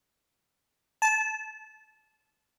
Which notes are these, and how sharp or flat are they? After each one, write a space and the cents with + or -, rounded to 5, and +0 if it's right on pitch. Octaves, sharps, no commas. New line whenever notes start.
A5 -20